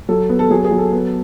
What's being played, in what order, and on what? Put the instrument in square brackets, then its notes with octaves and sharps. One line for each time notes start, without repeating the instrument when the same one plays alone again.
[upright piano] F#3 A4
B3
A4
F#3 G#4
G#4
F#3
A4
B3